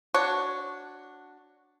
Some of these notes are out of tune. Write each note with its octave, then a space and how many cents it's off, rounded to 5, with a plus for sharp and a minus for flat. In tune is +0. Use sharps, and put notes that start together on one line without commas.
D4 +0 F#4 +0 C#5 +0